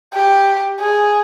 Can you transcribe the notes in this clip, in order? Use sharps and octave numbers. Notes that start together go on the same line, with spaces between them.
G4
G#4